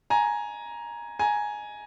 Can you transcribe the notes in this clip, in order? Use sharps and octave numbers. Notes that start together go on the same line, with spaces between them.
G#5 A#5
G#5 A#5